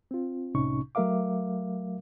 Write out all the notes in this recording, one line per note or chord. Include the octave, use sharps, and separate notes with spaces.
C4 F4
C2 A2 C3 C#4 D#4 C#6
F#3 A3 A#4 E5 F5 D6